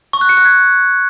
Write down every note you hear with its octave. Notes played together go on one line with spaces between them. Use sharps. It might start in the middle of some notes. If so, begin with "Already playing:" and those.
C#6
F#6
C#7
F#6
G#6